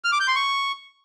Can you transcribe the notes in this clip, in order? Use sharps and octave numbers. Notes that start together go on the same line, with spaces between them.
F6
D6
G6
C6
C#6